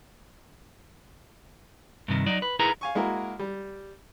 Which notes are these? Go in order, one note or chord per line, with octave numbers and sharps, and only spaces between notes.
G2 C3 D#3
F#3 D#4 D5
B4
D#4 E4 G#4 A#4 B4 A#5
F5 G#5 C#6
G#3 A#3 E4 F#4 A#4
G3